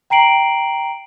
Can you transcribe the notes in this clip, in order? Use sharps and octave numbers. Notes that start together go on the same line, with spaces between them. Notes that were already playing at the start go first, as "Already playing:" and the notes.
G5 A#5 C7 D7 F#7